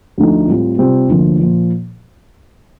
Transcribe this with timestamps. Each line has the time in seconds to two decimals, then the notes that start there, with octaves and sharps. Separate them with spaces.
0.18 D2 D3 F3 A3 D#4
0.48 A2 G3 C4 F4
0.78 C3 G3 C4 F4
1.08 D2 D3 F3 A#3
1.39 A#2 F3